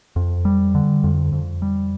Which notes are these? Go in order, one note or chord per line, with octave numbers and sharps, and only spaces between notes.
F2
G3
D3
F2
F2
G3